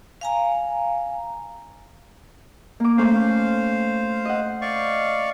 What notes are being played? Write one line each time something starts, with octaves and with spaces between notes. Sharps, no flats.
F5 G#5 A#5
A#3 D6
A3 C#4 C5 F5
D#5 F#5
D5 F5 C#6